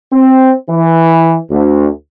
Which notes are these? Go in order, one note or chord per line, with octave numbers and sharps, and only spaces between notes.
C4
E3
D2